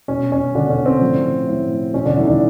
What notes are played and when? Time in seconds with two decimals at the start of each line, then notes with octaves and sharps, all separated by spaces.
0.08 B2 C#4
0.32 C#4
0.55 B2 D3 D4
0.70 C#4
0.86 C4
1.01 A2 F3
1.47 A2 F3
1.94 B2 C#4
2.05 D3 D4
2.16 E3 E4
2.23 D#4
2.28 D3 D4